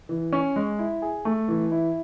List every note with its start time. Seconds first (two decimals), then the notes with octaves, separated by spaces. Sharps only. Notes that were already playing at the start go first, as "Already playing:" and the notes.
0.09 E3
0.33 C#4
0.56 G#3
0.79 E4
1.02 G#4
1.25 A3
1.48 E3
1.71 E4